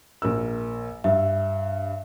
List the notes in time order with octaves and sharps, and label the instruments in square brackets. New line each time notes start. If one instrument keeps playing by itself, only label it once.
[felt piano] A#1 A#4 E6
[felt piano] G2 [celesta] E5